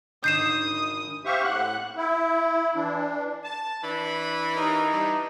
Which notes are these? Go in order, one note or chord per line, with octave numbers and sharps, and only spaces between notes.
G#1 D4 D#5 D#6 G6 C7 E7
G4 C5 E5 F5 C#6
A2 F#5 F#6
E4
E3 D4
A5
E3 D4 B5
C#4 D#4 G4 A#4
G3 D4